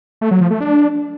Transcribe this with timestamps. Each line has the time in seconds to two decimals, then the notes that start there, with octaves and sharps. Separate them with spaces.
0.21 A3
0.31 F#3
0.41 F3
0.51 A3
0.60 D4